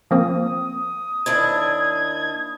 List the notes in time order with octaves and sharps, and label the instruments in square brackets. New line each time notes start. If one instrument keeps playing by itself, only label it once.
[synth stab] F3 A#3 C4 [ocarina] D#6
[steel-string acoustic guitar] D#2 D4 E4 [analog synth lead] G#6